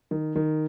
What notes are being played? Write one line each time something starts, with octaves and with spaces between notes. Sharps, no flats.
D#3
D#3